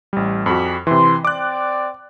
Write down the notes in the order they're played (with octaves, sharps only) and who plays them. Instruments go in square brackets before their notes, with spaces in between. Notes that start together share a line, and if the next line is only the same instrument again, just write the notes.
[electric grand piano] A1 G3
[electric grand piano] F2 F#4 [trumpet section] G3 G#4 B5
[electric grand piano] C3 E3 [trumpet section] C6
[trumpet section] C4 D5 [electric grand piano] D6 F#6